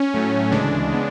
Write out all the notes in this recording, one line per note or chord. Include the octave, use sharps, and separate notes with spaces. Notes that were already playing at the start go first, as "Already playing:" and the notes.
Already playing: C#4
A2 F#3 A3
D2 C#3 E3 G#3 D4
C#3 G#3 B3